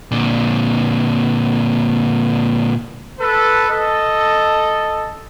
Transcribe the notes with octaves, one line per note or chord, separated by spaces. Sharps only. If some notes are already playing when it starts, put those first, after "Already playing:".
A#2 D3
A4 B4
A4 D#5